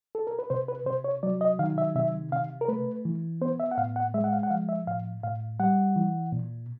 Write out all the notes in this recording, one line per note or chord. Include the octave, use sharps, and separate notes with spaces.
A4
A#4
B4
C3 C5
B4
C3 C5
C#5
F#3 D5
D#5
D#3 F5
E5
C3 E5
C3 F5
A#4
A3 B4
E3
B3 C5
E5
F#5
A2 F5
F#5
G#3 E5
F#5
F5
F#5
F3 F5
E5
A2 F5
A2 F5
G3 F#5
E3
A#2